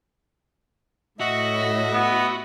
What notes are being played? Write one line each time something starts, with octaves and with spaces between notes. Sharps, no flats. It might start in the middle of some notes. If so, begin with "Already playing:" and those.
A2 F#4 D#5 E5
B3